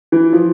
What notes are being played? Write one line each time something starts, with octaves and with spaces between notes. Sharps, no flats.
E3
F3